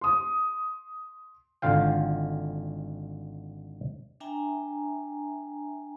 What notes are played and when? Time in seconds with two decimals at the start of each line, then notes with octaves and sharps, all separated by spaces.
0.01 C6 D#6
1.62 G#1 D3 F4 F5 G5
4.20 D4 E5 G5 G#5 A#5